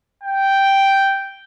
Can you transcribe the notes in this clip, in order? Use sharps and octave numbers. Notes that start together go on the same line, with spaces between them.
G5